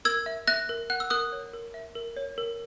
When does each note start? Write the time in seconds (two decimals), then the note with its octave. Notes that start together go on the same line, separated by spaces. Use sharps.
0.05 A#4 E6 G#6
0.26 E5
0.47 E5 F#6 A#6
0.69 A#4
0.90 F#5 F#6
1.00 E6
1.10 A#4 D#6 F#6
1.32 C#5
1.53 A#4
1.74 E5
1.95 A#4
2.17 C#5
2.38 A#4